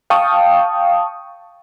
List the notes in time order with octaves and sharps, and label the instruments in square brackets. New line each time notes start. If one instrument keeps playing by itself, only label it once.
[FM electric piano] F5 G5 A5 C#6 D#6